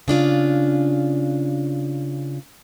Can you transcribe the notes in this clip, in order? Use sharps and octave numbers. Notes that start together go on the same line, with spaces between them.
C#3 D4 F4